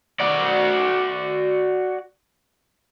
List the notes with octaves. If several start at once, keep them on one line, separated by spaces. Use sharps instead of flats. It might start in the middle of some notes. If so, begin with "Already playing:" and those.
F#4 D5